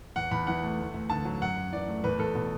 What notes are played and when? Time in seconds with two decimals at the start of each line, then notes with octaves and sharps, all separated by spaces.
0.16 E2 F#5
0.31 E2 B5
0.47 E3 F#5
0.63 A3
0.79 D2
0.94 D2
1.10 D3 A5
1.25 F#3
1.42 F#2 F#5
1.57 F#2
1.72 E3 D5
1.88 A3
2.04 E2 B4
2.19 E2 A4
2.35 B2